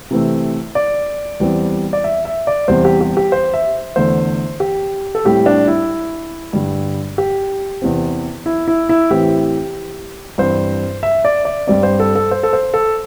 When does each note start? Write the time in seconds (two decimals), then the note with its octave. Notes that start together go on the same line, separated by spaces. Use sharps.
0.11 C3 E3 A3 C4
0.75 D5
1.40 E2 E3 G3 C4
1.93 D5
2.04 E5
2.25 E5
2.47 D5
2.68 E2 C3 G3 C4 C5
2.85 G4
3.01 G4
3.17 G4
3.32 C5
3.54 E5
3.96 E2 D3 A3 C5
4.60 G4
5.15 A4
5.25 A2 G3 C4 G4
5.46 D4
5.68 E4
6.53 G2 D3 G3
7.18 G4
7.82 E2 C3 E3 C4
8.46 E4
8.68 E4
8.89 E4
9.10 A2 E3 C4 G4
10.38 G2 E3 C4 C5
11.03 E5
11.25 D5
11.45 D5
11.67 G2 G3 C4 D5
11.83 C5
12.00 A4
12.15 A4
12.31 C5
12.43 A4
12.53 C5
12.74 A4